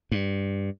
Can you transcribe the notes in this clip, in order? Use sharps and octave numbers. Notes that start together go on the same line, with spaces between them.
G2